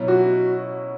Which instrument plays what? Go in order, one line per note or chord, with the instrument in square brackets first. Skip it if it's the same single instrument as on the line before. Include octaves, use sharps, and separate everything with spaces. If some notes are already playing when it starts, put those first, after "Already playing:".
Already playing: [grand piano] B2 F#3 C#4 E4
[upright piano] F#4